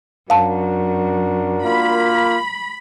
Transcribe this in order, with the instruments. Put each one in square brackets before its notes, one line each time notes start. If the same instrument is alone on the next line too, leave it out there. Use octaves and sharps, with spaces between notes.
[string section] F#2 [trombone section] D4 F#4 A#4 [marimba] F5 A5
[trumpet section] A#3 F4 [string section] B5